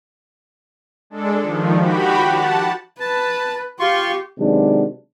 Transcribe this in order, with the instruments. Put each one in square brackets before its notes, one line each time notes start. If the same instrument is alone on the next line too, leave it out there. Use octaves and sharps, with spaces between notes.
[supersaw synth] G#3 D4 A4
D#3 F3
F#4 G4 B5
F#5 A5
[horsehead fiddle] B4 [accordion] A5
[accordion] F4 C6 C#6 [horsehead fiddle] G4
[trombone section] C3 D#3 F#3 G#3 B3 D4